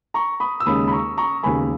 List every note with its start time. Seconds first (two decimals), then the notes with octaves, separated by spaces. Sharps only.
0.14 A#5 C#6
0.40 B5 D#6
0.60 E6
0.66 D#2 C#3 G#3 C#4 B5 D#6
0.88 B5
0.92 A#5 C#6
1.17 A#5 C#6
1.43 E1 D#2 C#3 G#5 B5